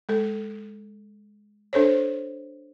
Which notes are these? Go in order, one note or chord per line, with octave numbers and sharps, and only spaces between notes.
G#3 A4
D4 A4 C5 C#5